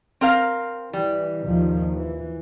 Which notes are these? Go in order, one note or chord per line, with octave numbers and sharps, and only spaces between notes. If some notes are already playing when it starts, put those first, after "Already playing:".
C4 A#4 F5
E3 G3
D#2 D#3 F3
E3